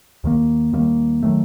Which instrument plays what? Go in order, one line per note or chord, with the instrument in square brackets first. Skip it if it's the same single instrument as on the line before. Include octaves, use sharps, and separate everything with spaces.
[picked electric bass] D#2 D#3 G3 A#3
D#2 D#3 G3 A#3
D#3 F#3 A3